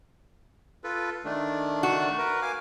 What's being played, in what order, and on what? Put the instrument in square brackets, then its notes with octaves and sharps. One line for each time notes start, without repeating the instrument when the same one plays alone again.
[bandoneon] F4 A4 B4
D#3 A3 D4
[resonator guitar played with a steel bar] F#4
[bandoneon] A#4 B4
F5 G#5 D6